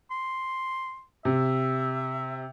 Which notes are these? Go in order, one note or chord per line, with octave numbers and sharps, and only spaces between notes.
C6
C3 E5